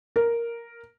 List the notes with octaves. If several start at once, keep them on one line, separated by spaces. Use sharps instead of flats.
A#4